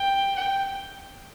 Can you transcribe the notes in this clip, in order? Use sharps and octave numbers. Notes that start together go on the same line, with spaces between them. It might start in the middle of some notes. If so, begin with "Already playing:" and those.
Already playing: G5
G5